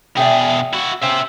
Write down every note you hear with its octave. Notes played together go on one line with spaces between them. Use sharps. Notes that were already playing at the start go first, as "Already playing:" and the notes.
B2 G#4 D5 E5 G5
E4 F#4
A#3 C#4 C5 E5 G5